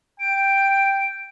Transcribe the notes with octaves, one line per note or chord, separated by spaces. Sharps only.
G5 D7